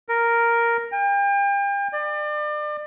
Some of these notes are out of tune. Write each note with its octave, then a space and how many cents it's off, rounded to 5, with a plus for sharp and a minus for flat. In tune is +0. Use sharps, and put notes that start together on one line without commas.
A#4 +0
G5 +40
D5 +35